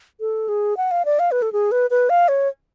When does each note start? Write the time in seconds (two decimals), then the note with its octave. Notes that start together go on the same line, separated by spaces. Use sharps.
0.20 A4
0.48 G#4
0.77 F#5
0.91 F5
1.05 D5
1.19 F5
1.31 B4
1.42 A4
1.52 G#4
1.71 B4
1.90 B4
2.09 F5
2.28 C#5